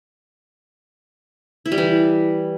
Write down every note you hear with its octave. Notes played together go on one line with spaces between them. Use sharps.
E4
G3
E3